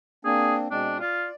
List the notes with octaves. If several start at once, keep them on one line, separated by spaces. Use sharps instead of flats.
A#3 C4 D4 G#4
B2 G#3 C4 D4
F4 D5